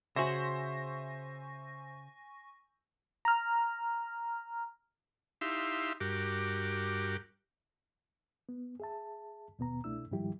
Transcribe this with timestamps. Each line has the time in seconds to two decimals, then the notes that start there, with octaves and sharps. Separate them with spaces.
0.16 C#3 F#4 C5 E5 G#5 C#6 A#6
3.25 A#5 F6
5.41 D#4 E4 G4 E5 F5 C6
6.00 G2 F#4 G4 A#4 D6
8.49 B3
8.80 G#4 E5 A5
9.59 D#2 B2 B3 A#5
9.84 C2 B2 A3 D4 E4 E6
10.11 G#2 D#3 F3 G3 E4 G4